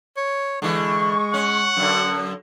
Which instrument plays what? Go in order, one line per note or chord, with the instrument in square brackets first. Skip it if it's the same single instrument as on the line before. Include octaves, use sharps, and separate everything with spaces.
[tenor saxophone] C#5
[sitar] D3 E3 [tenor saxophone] G#3 [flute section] C#6
[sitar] C#4 [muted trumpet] F#5
[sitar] F#2 D3